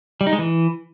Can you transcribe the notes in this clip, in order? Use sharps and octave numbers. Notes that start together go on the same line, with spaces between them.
G3
D#4
G#3
E3